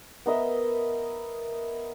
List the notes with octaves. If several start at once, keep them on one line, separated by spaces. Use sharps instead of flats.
B3 A#4 D#5 E5